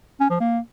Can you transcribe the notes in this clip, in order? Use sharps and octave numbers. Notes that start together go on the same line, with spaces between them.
C#4
F3
A#3